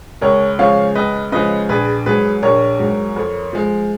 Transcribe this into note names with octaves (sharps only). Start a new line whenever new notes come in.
C#2 A#4 C#5
C#3 F3 G#3 C#5 F5
C#2 B4 D#5
C#3 F3 G#3 B4 D#5
A#1 G#4 B4
G#2 F#3 G#4 B4
A#1 A#4 C#5
G#2 F#3
F2
F3 G#3